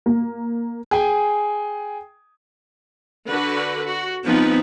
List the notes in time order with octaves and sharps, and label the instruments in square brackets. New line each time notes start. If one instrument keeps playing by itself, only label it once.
[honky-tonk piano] A#3
[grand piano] G#4 G5 G#5
[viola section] D3 F#4 B4
F#4
[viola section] F3 B4 [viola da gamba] B3 C4 D#4